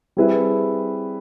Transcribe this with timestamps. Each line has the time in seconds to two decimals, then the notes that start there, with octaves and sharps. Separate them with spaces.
0.17 G3 C4 E4 G#4 B4